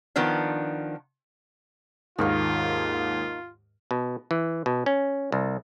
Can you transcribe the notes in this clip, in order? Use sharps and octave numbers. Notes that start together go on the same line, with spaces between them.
D#3 F3 B3 D4
D#2 G#2 D#3 A#3 F4
B2
E3
B2
C#4
C2